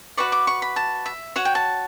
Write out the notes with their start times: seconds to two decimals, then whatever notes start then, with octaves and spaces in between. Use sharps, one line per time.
0.17 F#4 B4 D5 C#6
0.32 D6
0.47 C#6
0.62 B5
0.76 A5
1.06 E5
1.36 F#4 C#5 F#5
1.45 G5
1.55 A5